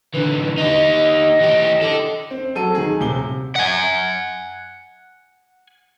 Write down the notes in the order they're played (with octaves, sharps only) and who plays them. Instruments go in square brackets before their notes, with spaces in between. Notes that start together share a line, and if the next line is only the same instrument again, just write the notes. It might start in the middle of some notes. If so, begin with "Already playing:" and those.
[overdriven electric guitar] D3 E3 [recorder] B4
[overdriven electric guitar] D#4 G4 [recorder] D#5
[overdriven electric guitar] E3 G4
A4 D5
[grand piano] C4
F#3 A4 D#7
D#3 G#4
D#1 C3 G7
[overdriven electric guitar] F#5 G#5